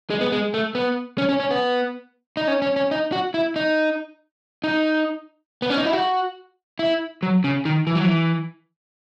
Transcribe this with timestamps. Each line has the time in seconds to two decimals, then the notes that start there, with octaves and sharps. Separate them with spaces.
0.10 G#3
0.21 B3
0.32 G#3
0.54 A3
0.75 B3
1.18 C#4
1.29 C#4
1.40 C#4
1.51 B3
2.37 D#4
2.48 C#4
2.62 C#4
2.76 C#4
2.91 D#4
3.12 F#4
3.34 E4
3.56 D#4
4.64 D#4
5.62 B3
5.70 C#4
5.78 D#4
5.85 E4
5.93 F#4
6.79 E4
7.23 F#3
7.44 C#3
7.65 D#3
7.87 E3
7.95 F#3
8.04 E3